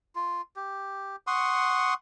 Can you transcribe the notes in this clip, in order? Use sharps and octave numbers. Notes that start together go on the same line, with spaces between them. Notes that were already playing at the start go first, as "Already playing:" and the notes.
F4
G4
F#5 C6 C#6 D#6